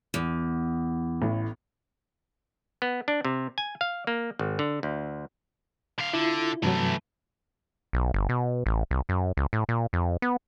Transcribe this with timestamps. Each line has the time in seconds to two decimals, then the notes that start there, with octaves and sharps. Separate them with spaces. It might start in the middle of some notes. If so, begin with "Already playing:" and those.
0.14 E2
1.22 A1 A2
2.82 B3
3.08 D4
3.25 C3
3.58 G#5
3.81 F5
4.07 A#3
4.39 G#1
4.59 D3
4.83 D2
5.99 D3 F5
6.13 D3 E4 F4
6.63 G2 C3 E3 F#3 A3
7.93 B1
8.14 G1
8.29 B2
8.66 A1
8.91 C2
9.09 F#2
9.37 C#2
9.53 A2
9.69 A#2
9.93 F2
10.22 B3